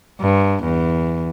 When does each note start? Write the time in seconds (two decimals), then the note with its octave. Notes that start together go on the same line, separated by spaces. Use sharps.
0.21 G2
0.63 E2